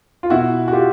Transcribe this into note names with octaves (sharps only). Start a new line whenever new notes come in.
F4
B2 E4 F#4
F#4
F4 G4